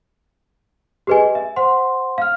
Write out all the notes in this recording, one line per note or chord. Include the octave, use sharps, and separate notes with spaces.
G4 G#4 B4 D#5 G#5
E5
C5 F#5 C6
F5 F6